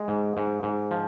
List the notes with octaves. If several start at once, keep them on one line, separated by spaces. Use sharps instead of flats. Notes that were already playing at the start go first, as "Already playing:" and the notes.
Already playing: G#3
G#2
G#2
G#2
F3